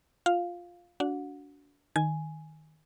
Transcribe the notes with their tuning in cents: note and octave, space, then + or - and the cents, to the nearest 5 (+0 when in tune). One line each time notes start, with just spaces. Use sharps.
F4 +5 F5 +0
D4 -30 F#4 +0 F#5 -30
D#3 +0 G#5 +5